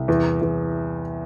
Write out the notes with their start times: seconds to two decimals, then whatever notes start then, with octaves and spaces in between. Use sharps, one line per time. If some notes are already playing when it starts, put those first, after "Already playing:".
Already playing: C2
0.08 E2
0.42 E2